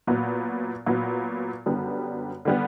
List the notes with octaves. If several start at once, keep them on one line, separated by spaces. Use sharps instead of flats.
A#2 F#3 B3
A#2 F#3 B3
F#2 D3 G3 B3
D3 G3 B3